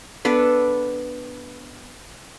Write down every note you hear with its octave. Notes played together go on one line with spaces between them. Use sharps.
B3 D4 A4 B4